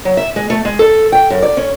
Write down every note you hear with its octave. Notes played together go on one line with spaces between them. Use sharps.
F#3
E5
G#3
A3
G#3
A4
G5
F#2
D5
C#4